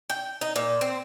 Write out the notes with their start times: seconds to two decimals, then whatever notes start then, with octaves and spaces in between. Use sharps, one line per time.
0.10 G5
0.41 D#4
0.56 A#2
0.81 C4